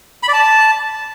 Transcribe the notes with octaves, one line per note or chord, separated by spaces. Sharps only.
B5
D5
A5